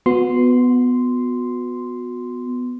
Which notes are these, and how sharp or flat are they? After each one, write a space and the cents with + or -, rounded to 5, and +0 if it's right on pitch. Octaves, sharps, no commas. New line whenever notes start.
B3 +10 F#4 -30 C6 -5